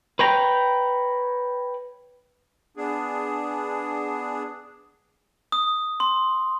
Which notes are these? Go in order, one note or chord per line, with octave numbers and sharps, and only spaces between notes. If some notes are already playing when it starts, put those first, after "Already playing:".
B4 C#5 G5 A#5
B3 D4 G#4
D#6
C6